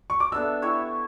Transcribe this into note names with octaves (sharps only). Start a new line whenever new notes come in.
C#6
D6
B3 D4 A4 E5 E6
E4 G4 C#5 E5